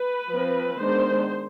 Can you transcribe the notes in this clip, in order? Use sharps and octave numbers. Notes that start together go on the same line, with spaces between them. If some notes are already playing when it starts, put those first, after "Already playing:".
Already playing: B4
F3 C4
D#3 G#3 B3 D4 C5